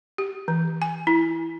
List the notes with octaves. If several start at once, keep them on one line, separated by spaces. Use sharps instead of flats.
G4
E3
G#5
E4